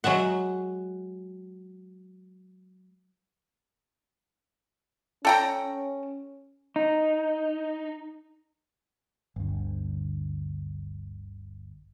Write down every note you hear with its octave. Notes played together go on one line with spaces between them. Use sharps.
F#3 G#3 E5 F#5
C#4 A4 G5 A#5
D#4
G1 D2